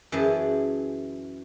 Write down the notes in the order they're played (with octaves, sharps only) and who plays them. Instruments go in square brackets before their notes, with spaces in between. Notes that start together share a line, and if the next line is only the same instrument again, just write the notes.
[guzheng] F#2 E3 G#4 A5